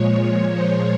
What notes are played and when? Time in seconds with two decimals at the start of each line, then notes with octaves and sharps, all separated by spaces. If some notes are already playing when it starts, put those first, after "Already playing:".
Already playing: A#2 F3 G#3 C#5
0.49 C5